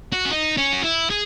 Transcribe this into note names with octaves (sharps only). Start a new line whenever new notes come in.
F#4
C#4
D#4
C#4
F#4
E4
G#4